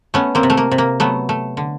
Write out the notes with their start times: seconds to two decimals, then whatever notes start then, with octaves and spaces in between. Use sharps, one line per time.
0.14 A3 B3 C#4
0.35 A#3 C4
0.43 C3
0.50 A3
0.57 A#3
0.71 C3
0.78 A#3
1.00 F#3 A3 B3
1.29 A3
1.57 D3